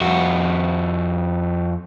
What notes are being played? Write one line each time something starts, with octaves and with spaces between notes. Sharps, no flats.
F2 F#4